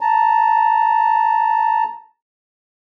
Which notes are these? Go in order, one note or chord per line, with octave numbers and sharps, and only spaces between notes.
A5 A#5